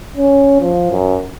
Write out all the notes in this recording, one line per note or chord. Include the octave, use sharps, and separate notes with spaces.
C#4
F3
F#2